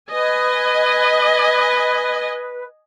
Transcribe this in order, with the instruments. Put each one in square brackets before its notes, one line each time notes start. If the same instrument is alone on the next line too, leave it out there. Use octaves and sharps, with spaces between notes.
[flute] B4 [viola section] D#5 G#5